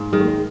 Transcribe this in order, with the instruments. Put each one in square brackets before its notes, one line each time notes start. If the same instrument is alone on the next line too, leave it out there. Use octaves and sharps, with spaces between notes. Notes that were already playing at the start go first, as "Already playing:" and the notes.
Already playing: [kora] G#2 A#3
[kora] D#3 [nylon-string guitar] G#3
[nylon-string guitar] A3
G#3